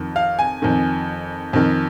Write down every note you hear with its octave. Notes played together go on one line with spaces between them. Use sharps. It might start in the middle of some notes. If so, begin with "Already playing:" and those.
Already playing: F2 D#3
F5
G#5
F2 D#3
F2 D#3